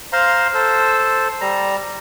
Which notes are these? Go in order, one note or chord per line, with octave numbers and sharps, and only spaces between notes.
C5 F5 A#5 C6
A4 C5
G3 A#5